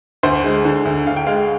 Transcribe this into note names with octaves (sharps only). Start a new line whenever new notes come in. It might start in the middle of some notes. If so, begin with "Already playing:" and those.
D2 C5
G#3
D3
D2
D2 F5
G5
G#3 F5